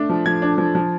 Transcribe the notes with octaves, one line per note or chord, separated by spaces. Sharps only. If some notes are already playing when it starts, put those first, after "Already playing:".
Already playing: A3 D4
F3
F3 G#6
D4
F3
F3